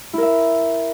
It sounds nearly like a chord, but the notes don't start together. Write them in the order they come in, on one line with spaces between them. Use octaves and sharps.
E4 A#4 E5